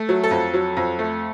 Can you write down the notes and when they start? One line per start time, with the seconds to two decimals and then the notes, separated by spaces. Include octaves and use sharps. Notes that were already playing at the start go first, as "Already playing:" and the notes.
Already playing: A3
0.09 F#3
0.24 A4
0.31 F2
0.54 F#3
0.77 F2
0.99 A3